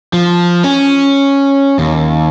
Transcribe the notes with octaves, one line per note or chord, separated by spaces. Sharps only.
F3
C#4
D#2